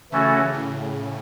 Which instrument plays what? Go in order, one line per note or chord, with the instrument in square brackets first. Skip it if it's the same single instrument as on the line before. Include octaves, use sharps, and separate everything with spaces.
[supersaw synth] C#3 [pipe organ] E3 A3 C#4 F#4 A4
[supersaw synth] A2